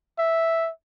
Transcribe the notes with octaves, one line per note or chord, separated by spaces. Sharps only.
E5